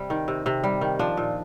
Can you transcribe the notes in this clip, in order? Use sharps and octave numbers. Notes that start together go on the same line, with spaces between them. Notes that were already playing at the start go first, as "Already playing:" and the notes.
Already playing: C3 G3
D#3
C3
C3
G3
D#3
F3 D4
A#2